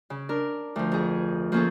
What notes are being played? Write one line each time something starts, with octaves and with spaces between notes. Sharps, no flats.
C#3
D4 A#4
D2 F3
F2 G#4
F3 A#3 C#4 G#4 A4